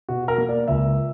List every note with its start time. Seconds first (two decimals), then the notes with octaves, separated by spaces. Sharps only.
0.09 B2 F#4
0.28 A#4
0.38 A#3
0.49 D5
0.68 C#2 E5